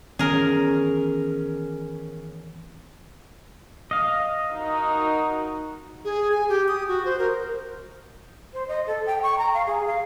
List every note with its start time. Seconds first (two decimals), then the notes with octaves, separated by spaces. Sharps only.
0.19 D#3 E3 B3 C#4 G#4 A#4
3.91 D#5 F5
4.52 D#4 F#4 A#4
6.05 G#4
6.32 G#5
6.49 G4
6.68 D#6
6.88 F#4
7.05 C5
7.19 A#4
8.54 C5
8.68 D#5
8.87 A4
9.06 G5
9.23 C#6
9.38 A#5
9.54 F5
9.66 G#4
9.87 F5